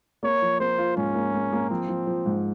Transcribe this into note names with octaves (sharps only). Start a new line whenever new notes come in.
A#3 C#5
F3
A#3 C5
F4
G#2 C#4
A#3
A#3
A#3
F3 C4
F3
F3
G#2